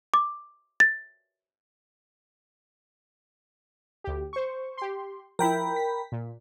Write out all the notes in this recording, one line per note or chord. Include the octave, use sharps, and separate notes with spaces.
D6
A6
D2 G4
C5 C#6
G4 C6
F3 E4 A#4 G5 B5
B6
A#2